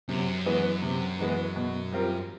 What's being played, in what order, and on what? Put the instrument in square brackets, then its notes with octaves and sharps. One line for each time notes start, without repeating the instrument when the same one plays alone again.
[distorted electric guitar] F#2 [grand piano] C3
[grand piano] E3 G#3 B3
C3
E3 G#3 B3
B2
G3 C4 F4 A#4